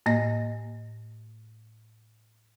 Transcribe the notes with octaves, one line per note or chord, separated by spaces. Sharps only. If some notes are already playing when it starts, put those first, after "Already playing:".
A2 A#3 D#5 A#6